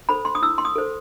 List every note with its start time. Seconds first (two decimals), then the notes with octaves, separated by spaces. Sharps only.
0.09 A4 C5 B5
0.25 C6
0.35 D#6
0.42 E4 E6
0.58 C6
0.65 D#6
0.76 A4 C5